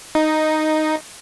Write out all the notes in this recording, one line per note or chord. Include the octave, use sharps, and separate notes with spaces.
D#4